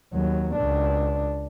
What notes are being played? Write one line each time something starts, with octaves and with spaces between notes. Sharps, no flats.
D#2 F#3
C#2 D4